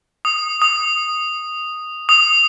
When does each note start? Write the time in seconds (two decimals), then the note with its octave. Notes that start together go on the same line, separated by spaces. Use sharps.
0.25 D#6
0.62 D#6
2.09 D#6